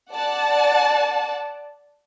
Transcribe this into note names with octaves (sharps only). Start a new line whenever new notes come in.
D5 F#5 A5